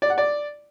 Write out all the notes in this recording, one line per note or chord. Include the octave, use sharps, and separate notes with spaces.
D5
F#5
D5